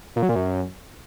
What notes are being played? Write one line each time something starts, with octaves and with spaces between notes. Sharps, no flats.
A#2
F#3
A#2
F#2